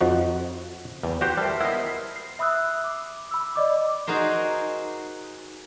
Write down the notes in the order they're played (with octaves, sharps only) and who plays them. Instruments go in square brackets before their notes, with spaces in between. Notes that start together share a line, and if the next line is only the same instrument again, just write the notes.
[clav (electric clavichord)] F2 F3 D#4 F#4
[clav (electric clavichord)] E2 [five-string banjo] G3
[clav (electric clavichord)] F#4 G4 C5 [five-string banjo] F#5
[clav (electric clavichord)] G3 [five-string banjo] A4 [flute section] A#4 C5 E5
[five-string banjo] B3 D#5 [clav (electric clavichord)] E4
[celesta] C7
E5 B5 D#6 E6 F#6
D6
B5 E6
D5 D#5 D6
[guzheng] D#4 F#4 G#4 A#4 C5